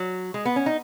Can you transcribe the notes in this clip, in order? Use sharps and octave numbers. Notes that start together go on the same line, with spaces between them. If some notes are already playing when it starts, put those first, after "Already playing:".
Already playing: F#3
G#3
B3
C#4
D#4